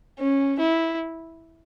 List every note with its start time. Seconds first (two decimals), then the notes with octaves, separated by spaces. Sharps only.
0.19 C#4
0.60 E4